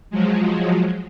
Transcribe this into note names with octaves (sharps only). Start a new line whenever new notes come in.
F3 F#3 G#3